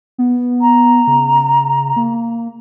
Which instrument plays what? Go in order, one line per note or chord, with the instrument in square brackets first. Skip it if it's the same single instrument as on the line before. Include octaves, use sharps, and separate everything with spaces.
[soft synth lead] B3
[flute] A#5
[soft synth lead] C#3
A#3